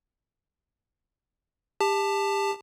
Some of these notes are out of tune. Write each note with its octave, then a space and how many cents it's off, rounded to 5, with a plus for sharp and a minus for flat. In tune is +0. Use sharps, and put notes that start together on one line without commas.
G4 +25 A5 +0